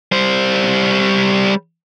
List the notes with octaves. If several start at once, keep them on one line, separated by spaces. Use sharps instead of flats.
G3 C5